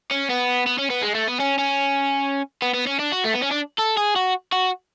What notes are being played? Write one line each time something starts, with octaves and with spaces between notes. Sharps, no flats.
C#4
B3
B3
C#4
B3
G#3
A3
B3
C#4
C#4
B3
B3
C#4
D4
F#4
A3
B3
C#4
D4
A4
G#4
F#4
F#4